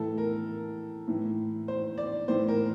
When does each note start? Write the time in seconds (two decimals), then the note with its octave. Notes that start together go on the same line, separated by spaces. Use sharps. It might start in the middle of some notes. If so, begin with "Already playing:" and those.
Already playing: A2 E3 A4
0.18 A#4
1.08 A2 E3
1.68 C5
1.98 D5
2.28 A2 E3 C5
2.48 A#4